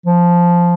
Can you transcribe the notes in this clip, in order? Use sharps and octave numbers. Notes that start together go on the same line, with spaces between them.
F3